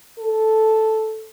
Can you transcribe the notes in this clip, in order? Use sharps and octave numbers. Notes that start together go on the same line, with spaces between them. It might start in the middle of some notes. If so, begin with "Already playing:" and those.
A4